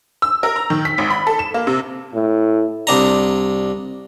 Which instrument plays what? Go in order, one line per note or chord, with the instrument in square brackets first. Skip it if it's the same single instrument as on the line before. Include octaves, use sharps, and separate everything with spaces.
[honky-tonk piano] E6
A#4
A#5
D#3
B6
G#1
B5
A4
E7
A#3
C3
[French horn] A2
[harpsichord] C2 D4 A#5